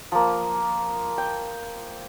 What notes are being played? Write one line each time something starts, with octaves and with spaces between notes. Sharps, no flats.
F3 A#3
G5